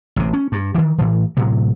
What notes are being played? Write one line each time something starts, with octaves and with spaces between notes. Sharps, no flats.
A1 C3
C#4
G2
D#3 E3
A2 E3
A2 C3 F#3